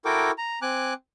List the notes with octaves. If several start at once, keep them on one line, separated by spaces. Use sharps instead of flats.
E4 F#4 A4 A#4 G5 D6
A#5
C4 G#5 D6 F#6